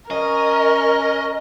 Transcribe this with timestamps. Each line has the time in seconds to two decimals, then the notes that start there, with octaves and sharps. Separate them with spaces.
0.11 C#4 A#4 D#5